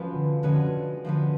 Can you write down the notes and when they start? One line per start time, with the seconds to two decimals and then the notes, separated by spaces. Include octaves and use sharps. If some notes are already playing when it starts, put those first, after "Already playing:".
Already playing: F3 G#3 C#4 F#4 B4
0.13 D3
0.43 D3 F3 G#3 C#4 F#4 B4
1.05 D3 F3 G#3 C#4 F#4 B4